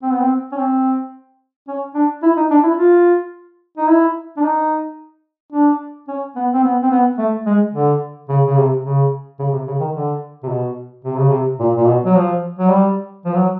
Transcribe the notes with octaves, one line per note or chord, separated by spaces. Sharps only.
C4
B3
C4
C#4
C4
C#4
D4
E4
D#4
D4
E4
F4
D#4
E4
D4
D#4
D4
C#4
B3
C4
B3
C4
B3
A3
G#3
D3
C#3
C#3
C3
C#3
C#3
C3
C#3
D#3
D3
C3
B2
C3
C#3
C3
A#2
A#2
B2
F#3
F3
F#3
G3
F3
F#3